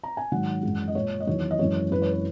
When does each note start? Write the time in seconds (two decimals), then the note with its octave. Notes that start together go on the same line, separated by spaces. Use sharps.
0.04 A#5
0.17 G#5
0.32 G#2 D#3 F#3 F#5
0.63 F#2 E3 G#3
0.88 D#5
0.95 A#2 G#3 C#5
1.20 D#5
1.27 E2 D#3 F#3 C#5
1.51 D#5
1.59 F#2 E3 G#3 C#5
1.91 F#2 E3 G#3 B4
2.02 C#5
2.12 B4